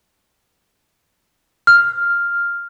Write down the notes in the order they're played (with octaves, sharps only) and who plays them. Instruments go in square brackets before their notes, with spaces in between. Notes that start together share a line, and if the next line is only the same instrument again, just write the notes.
[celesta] F6